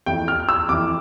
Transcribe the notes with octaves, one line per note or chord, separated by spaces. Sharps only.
F2 E3 G5
F6
E6
F2 E3 D6